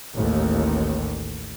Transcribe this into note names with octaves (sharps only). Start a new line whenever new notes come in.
A1 D#2